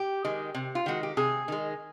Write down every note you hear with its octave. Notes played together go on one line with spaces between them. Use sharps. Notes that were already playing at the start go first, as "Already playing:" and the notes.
Already playing: G4
D#3 G#3
C3
F4
D#3 G#3 F#4
G4
C3 G#4
D#3 G#3